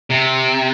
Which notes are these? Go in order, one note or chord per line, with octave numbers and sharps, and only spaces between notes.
C3